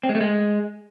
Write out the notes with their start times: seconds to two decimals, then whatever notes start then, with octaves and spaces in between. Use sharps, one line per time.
0.03 C4
0.09 G#3
0.15 A3
0.21 G#3